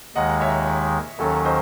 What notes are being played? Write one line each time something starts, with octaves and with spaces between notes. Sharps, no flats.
D#2 D#3 G#3 D#5 F#5
C#5 E5
D#2 D#3 F#3 C#4 A4 C#5
C5 D#5